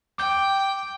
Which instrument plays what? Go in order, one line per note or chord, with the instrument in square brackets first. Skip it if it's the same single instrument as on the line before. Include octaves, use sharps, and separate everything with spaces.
[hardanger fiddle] G5 [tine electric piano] D6 G6